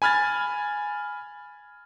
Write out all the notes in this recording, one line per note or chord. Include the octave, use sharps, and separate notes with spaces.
G#5 B5 F6 G#6 A6